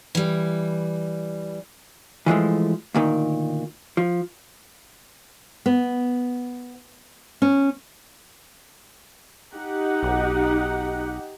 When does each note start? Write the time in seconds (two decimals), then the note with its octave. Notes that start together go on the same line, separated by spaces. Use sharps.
0.15 E3 G3
2.26 E3 F3 G#3 A3
2.95 D2 A#2 D#3
3.97 F3
5.66 B3
7.42 C#4
9.54 D#4 G4 F#5
10.03 B1